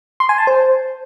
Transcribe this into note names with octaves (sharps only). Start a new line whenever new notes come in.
C6
G#5
A5
C5